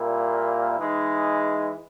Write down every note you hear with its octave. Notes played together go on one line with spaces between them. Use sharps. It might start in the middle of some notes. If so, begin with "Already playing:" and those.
Already playing: A#2 G3 A#3 E4
E3 G#3 D#4 G#4